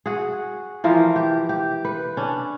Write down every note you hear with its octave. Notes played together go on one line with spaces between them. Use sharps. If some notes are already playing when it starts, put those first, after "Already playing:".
F#4 G#4
E3 F3 A#4
G4
G4
B4
C#4 D4